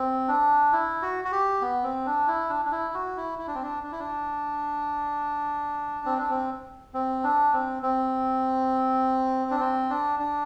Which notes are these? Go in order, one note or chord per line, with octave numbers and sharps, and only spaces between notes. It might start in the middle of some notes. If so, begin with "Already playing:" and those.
Already playing: C4
D4
E4
F#4
F#4
G4
B3
C4
D4
E4
D4
D4
E4
F#4
E4
E4
D4
C4
D4
D4
E4
D4
C4
D4
C4
C4
D4
C4
C4
D4
C4
D4
D4